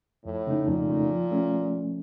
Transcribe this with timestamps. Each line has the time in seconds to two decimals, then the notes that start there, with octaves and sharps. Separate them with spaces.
0.25 F2 A2
0.47 C#3 A3 D#4
0.68 F2 A#2
0.89 C#3 A3 D#4
1.10 F3
1.31 A3 C#4